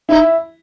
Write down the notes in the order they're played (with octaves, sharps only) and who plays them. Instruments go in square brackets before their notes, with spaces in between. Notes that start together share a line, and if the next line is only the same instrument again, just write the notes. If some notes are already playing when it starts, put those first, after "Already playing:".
[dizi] D#4 [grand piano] E4